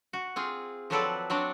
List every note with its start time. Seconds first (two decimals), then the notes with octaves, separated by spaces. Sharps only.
0.13 F#4
0.36 C4 F4 G#4
0.90 F3 F#3 C4 A4 B4 D5
1.30 F#3 C4 D4 F#4 D5